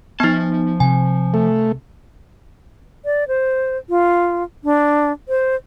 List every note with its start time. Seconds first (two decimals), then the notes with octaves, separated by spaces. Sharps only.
0.20 F3 B3 D#4 A5
0.80 C3 G#5
1.34 A3
3.05 D5
3.28 C5
3.89 F4
4.64 D4
5.29 C5